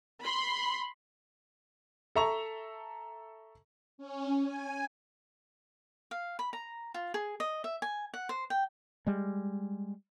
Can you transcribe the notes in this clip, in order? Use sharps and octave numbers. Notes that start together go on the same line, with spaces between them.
B5 C6
A4 E5 A#5 C#6 F7
C#4
G#5
F5
B5
A#5
F4
G#4
D#5
E5
G#5
F#5
C5
G5
G3 G#3